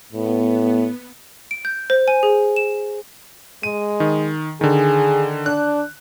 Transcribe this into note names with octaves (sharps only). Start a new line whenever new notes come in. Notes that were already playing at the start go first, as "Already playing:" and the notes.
A2 B3
D7
G6
C5
G#5
G#4
E7
G#3 D#7
D#3
D3 D#3 G#4
D4 F#6